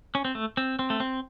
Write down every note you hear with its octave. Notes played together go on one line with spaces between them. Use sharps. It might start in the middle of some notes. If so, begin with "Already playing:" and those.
C#4
C4
A3
C4
C4
A3
C4